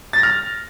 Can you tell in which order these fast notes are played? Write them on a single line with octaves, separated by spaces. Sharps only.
A6 A#6 F6